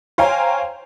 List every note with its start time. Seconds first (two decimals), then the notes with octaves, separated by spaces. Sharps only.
0.18 C5 C#5 F5 G5 G#5 A#5